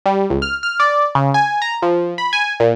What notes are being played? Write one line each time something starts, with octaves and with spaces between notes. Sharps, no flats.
G3
C#2
F6
F6
D5
C#3
G#5
A#5
F3
B5
G#5
A#2